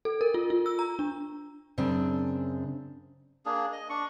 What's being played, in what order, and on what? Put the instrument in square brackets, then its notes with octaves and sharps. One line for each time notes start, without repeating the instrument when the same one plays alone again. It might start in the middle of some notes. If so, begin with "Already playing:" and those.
[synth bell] A4
A#4
F4
F4
E6
A#5
D4
[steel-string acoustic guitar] F#2 C#3 C4 D4
[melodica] A#3 D4 G#4
D#5
D4 C#6